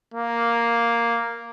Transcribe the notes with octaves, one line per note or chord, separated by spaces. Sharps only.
A#3